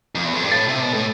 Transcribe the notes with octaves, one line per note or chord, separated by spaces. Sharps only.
F2
E2
F2
G2
A2 A6
C3
B2
A2